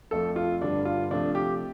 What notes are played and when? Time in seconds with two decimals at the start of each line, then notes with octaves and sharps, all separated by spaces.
0.11 F2 F3 A3 A4
0.36 F4
0.61 G2 D3 G3 D4
0.85 F4
1.11 C3 F3 A3 D4
1.35 G4